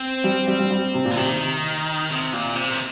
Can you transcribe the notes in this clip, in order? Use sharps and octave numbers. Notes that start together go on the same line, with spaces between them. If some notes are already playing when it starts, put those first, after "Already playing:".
Already playing: C4
G3
G3
G3
G3
C3
A#2
D3
C3 D#3
C3
A#2
C3
D#3